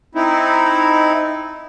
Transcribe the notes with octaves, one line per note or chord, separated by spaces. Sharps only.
C4 D#4 E4